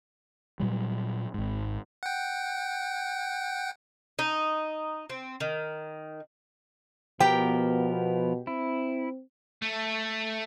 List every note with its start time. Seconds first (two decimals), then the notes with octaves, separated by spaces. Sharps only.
0.60 A#2 F#3 G3
1.34 G#1 G#2
2.03 F#5 G5
4.19 D#4
5.10 C4
5.40 D#3
7.20 B2 F3 B3 G4 A#4 G5
8.47 C4 E4
9.62 A3